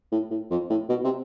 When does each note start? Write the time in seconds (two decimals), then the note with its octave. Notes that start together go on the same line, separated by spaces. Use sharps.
0.12 A2
0.30 A2
0.50 F2
0.70 A2
0.89 B2
1.04 C3